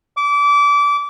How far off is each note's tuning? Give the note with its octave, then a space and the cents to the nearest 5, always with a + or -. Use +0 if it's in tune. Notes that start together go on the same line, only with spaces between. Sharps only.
D6 -25